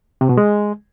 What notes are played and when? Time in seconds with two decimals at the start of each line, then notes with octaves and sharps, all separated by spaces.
0.21 C3
0.29 B2
0.38 G#3